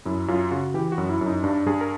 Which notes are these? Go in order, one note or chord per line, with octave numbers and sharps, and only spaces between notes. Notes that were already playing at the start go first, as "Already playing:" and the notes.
F#2 E4
F#2 F4
C#3 F#4
E3 G4
F#4
F#2
E4
F#2 D#4
G2 D4
G2 G#4
A#4